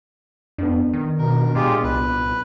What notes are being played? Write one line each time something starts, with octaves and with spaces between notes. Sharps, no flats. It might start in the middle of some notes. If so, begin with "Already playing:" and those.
F2 B3 D4
D#3
B2 A#4
A#2 G#3 F4 G4
C2 B4